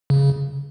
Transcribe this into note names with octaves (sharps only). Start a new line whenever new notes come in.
C#3